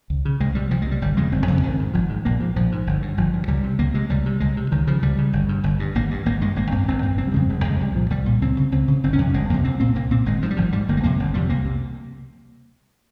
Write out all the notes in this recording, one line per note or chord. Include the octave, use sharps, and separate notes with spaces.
C#2
C#3
C2 G#3
C3 G3
C2 F3
G#3
C3 G3
G1 G3
F2 C#3 G#3
G1 C4
F2 C#3 C4
G#1 D#3
G#2
G#1 F3
G#2
A#1 A#3
G#2 F3
A#1 F3
G#2
G1
G2
G1 F3
G2
C#2 G3
C3
C#2 A#3
C3 G#3
C#2 G3
C3
C#2 G#3
C3
C#2 D#3
C#3 F3
C#2 G3
C#3
G1
G2
G1
G2
G#1 A#3
G2
G#1 A#3
G2 G#3
G#1 A#3
G2 C4
G#1 C4
G2
F1 C4
G3
F2 C#3 G#3
F1 G#3
F2 C#3 G#3
C2 G3
A#2 F3
C2 G3
A#2
C#2 C4
C#3
C#2 C4
C#3
G1 C4
C#4
F2 C3
G1 G#3
F2 C3 A#3
C2 C4
A#2 C4
C2 A#3
A#2 C4
G#1 G#3
G#2 F3
G3
G#1 F3
G#2 G3
G1 A#3
G#3
F2 C3 A#3
G1
F2 C3 G3
C2 A#3
C3